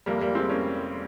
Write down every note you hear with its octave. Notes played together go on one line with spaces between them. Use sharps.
F1 F2 C3 G3 A#3
G3 A#3
G#3 C4
A#3 C#4